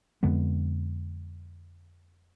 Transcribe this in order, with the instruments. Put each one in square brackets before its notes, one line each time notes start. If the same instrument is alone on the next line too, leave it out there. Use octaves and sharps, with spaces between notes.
[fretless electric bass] F2 D3 G#3 B3